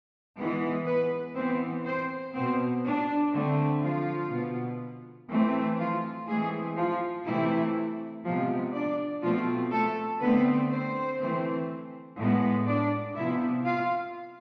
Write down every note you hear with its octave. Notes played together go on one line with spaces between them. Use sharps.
E3 G#3 B3
B3 B4
E3 B3 C4 C5
C4 C5
B2 B3 C4 C5
D4
D3 A3 C4
F3 F4
B2 B3
E3 A3 C4
F3 F4
E3 G#3 A3 C4 G#4
F3 F4
C3 E3 A3 C4 E4
C3 F3 G#3 B3 F4
D4 D5
B2 F3 A3 C4 F4
A3 A4
D3 A3 B3 C4 B4
C4 C5
E3 A3 C4
A2 G#3 B3
D4 D5
C3 F3 B3 E4 E5
F4 F5